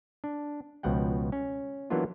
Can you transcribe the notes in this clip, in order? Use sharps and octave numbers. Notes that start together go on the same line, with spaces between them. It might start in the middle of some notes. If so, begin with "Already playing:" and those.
D4
C#2 B2 F3 F#5 G5
C#4
E3 F#3 A#3 B3 D4 F4